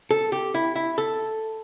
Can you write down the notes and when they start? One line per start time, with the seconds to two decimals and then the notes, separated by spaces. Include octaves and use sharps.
0.11 A4
0.32 G4
0.54 E4
0.76 E4
0.98 A4